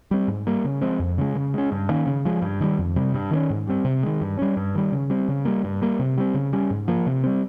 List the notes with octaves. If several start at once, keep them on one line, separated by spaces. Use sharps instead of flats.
G3 C4
G#2
G3 A#3
C#3
F3 G#3 C4
F2
C#3 G#3
C#3
G#3 C#4
G2
D#3 A#3 C#4
C#3
F3 G#3
G2
D#3 G3
F2
C3 G3
G2
D#3 A#3 C#4
G#2
G3 C4
C3
D#3 G#3
G2
G3 C#4
G2
D#3 G3
C#3
G3 C4
C#3
G3 A#3
G2
G3 A#3
C3
G3 C4
C#3
G3 C#4
G#2
F3 A#3
C3
G3 C4